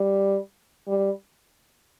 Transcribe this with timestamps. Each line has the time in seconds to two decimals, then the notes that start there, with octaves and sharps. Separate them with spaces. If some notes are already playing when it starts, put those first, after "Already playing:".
Already playing: G3
0.88 G3